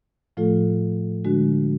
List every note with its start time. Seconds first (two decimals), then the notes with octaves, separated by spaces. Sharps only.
0.37 A2 F3 A3 F4 A4
1.24 D3 G#3 D4 F#4